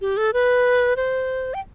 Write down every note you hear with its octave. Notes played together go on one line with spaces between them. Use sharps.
G4
A4
B4
C5
G5